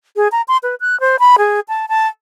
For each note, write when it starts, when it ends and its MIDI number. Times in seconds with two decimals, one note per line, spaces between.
0.16 0.28 68
0.32 0.42 82
0.48 0.57 84
0.63 0.75 71
0.81 0.98 90
1.00 1.16 72
1.19 1.36 83
1.38 1.60 68
1.68 1.86 81
1.89 2.07 81